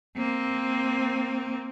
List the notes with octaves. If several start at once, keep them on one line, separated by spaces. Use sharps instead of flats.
A#3 C4